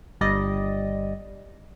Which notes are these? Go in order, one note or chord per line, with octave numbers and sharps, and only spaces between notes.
G1 G3 D5 D#5